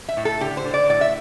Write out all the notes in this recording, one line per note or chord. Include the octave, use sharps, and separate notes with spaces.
E5
A2
A4
D3 G4
C5
D3
D5
A2 D5
E5